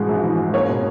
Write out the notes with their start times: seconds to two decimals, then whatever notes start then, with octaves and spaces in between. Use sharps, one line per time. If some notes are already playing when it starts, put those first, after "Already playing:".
Already playing: G#2 B2 E3 G#3
0.09 A#1
0.23 E3
0.38 G#2
0.53 A#3 C#5
0.68 B2